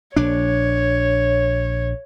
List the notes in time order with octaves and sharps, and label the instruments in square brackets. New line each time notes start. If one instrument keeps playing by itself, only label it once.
[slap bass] A#1 D4 [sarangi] C#5